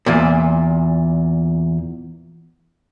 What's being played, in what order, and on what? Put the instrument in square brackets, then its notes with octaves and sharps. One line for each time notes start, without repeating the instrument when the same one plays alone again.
[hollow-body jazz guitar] E2 A#2